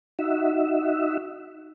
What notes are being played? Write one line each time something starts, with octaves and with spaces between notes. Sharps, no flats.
D#4 F#4 E5